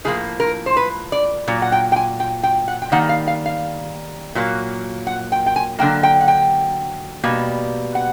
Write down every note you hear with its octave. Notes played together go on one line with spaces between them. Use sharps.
A2 F3 A#3 G#4
A#4
C5
B4
D5
A#2 F#3
F#5
G5
G5
G#5
G5
G5
F#5
G5
D#3 G3 A#3 F#5
F5
F5
F5
A#2 F#3 A#3
F#5
G5
G5
G#5
D3 F#3 A#3 G5
G5
F#5
G5
B2 G3 A#3
F#5